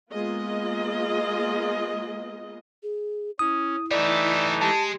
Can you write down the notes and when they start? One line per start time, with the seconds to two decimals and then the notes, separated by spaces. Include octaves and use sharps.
0.12 G#3 A#3 B3 F4 G#4 D#5
2.83 G#4
3.39 C#4 E4 D#6
3.91 E3 G3 A3 D#4 A4 D5
4.61 G#3 G4 A5